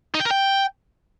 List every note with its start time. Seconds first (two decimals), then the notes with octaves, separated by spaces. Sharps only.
0.15 D#4
0.20 G5
0.25 A#4
0.31 G5